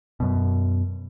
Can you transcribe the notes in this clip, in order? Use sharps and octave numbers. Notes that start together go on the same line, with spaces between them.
F#2 B2